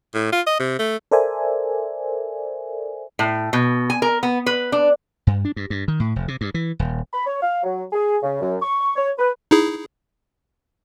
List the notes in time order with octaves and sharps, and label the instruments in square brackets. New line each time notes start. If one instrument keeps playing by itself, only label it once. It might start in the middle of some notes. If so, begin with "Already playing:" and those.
[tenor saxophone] A2
F4
D#5
C3
A3
[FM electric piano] A4 A#4 C5 D5 E5 G#5
[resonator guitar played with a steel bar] A2
B2
G#5
A#4
B3
B4
D4
[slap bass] G2
D4
G2
G2
D#3
A2
F1
C3
G2
E3
D#1
[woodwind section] B5
C#5
F5
F#3
G#4
C#3
F#2
C#6
C#5
B4
[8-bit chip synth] D#4 E4 G#4